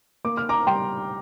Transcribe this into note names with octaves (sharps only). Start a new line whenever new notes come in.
A#3 D6
F6
A#5 D6
G3 G5 C6